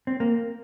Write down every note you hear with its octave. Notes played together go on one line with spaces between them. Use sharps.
C4
A#3